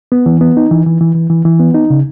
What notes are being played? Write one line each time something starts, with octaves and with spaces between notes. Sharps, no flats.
B3
E3
B3
D#4
E3
E3
E3
E3
E3
E3
B3
D#4
C#3